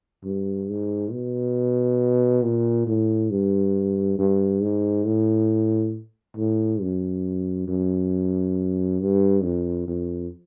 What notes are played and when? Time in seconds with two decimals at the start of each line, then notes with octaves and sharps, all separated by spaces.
0.24 G2
0.69 G#2
1.12 B2
2.43 A#2
2.87 A2
3.30 G2
4.19 G2
4.62 G#2
5.06 A2
6.37 A2
6.81 F#2
7.68 F#2
9.00 G2
9.43 F2
9.88 F2